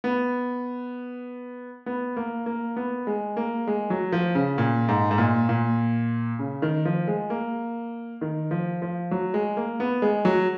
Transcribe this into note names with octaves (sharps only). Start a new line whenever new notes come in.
B3
B3
A#3
A#3
B3
G#3
A#3
G#3
F#3
F3
C#3
A#2
G#2
G#2
A#2
A#2
C#3
D#3
F3
G#3
A#3
D#3
F3
F3
F#3
G#3
A#3
B3
G#3
F#3